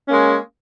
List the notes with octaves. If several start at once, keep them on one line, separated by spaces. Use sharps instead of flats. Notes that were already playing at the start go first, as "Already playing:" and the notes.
G#3 A#3 C#4